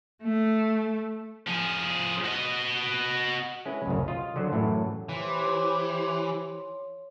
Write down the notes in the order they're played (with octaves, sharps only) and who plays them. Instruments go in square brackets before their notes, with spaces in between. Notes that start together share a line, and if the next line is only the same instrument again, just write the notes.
[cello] A3
[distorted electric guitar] F3 G#4
F#4 D#5
[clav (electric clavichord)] G#3 C#4 E4 B4
C2 F#2 A2 C#3
F4 D#5 F5
D3 F#3 C5
F#2 A2 E3 F#3
[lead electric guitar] E3 [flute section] G4 C5 [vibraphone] C#5 C6